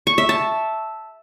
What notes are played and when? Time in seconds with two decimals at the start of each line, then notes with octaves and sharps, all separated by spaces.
0.07 C#6
0.18 E5
0.29 A5